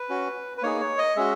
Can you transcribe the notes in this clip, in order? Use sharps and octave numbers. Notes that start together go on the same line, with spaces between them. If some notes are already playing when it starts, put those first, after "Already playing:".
Already playing: B4
C#4 F#4
B4
A#3 D#4 G#4 C#5
C#5
D#5
G#3 C#4 F#4 E5